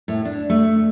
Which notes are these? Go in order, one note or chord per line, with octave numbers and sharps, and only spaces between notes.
A2
D4
A3